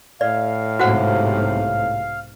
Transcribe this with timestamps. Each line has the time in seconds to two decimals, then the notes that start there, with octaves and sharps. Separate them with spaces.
0.21 A2 D5 F5
0.79 B1 G#2 C3 F#4 C5 F#5